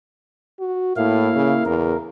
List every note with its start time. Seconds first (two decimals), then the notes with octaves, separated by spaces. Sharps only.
0.60 F#4
0.96 A2 A#3 E4 F5
1.36 C#3
1.65 E2 A#4